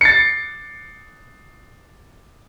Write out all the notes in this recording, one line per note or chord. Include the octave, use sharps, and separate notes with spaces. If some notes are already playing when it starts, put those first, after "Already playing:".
A6 C7 C#7